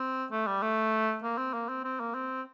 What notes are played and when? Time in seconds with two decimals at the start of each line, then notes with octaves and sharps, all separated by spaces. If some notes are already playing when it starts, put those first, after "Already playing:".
Already playing: C4
0.31 A3
0.47 G3
0.62 A3
1.24 A#3
1.38 C4
1.54 A#3
1.69 C4
1.84 C4
2.00 A#3
2.15 C4